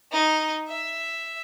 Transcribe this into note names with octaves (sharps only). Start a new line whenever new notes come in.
D#4
E5